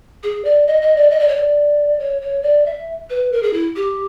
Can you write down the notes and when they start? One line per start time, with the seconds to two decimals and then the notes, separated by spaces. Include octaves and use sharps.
0.23 G#4
0.45 D5
0.67 D#5
0.82 D#5
0.96 D5
1.10 D#5
1.19 D5
1.28 C#5
1.37 D5
1.99 C#5
2.21 C#5
2.43 D5
2.66 E5
3.10 B4
3.32 A#4
3.43 G#4
3.53 E4
3.76 G4